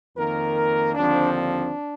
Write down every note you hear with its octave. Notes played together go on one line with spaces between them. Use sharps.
F2 D#3 A#3 A#4
D#2 D3 F3 C4 D4
D4